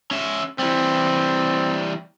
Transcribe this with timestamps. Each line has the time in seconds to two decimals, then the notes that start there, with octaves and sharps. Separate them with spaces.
0.11 C#4 E5
0.59 E3 G3 C4